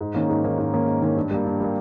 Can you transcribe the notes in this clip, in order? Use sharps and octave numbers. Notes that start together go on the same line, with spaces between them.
G#2
D#3 A#3 C#4
G#2
D#3 A#3 C#4
G#2
D#3 A#3 C#4
G#2
D#3 A#3 C#4
G2
G3 A#3
G2
G3 A#3